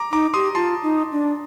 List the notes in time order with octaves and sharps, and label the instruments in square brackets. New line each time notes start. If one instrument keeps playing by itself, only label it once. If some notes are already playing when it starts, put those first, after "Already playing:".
Already playing: [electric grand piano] A#5 D6
[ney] D#4 [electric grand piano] A#5 D6
[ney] G4 [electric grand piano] C6 D#6
[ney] F4 [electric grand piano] A5 C6
[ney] D#4
D4